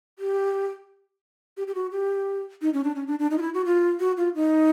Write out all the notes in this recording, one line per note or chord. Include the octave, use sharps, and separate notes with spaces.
G4
G4
G4
F#4
G4
D#4
C#4
D4
C#4
D4
D4
D#4
F4
E4
F#4
F4
F#4
F4
D#4